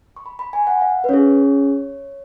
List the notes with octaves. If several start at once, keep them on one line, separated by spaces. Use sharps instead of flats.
C#6
B5
B5
G#5
F#5
F5
B4
C#4 G#4 C#5